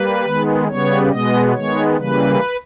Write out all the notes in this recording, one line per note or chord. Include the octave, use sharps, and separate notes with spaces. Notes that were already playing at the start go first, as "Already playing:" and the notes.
Already playing: G3 A#3 B4
D#3 G#3 B3
C#3 G3 B3 C#5
B2 G#3 B3 D#5
D#3 G#3 B3 C#5
C#3 E3 G3 A#3 B4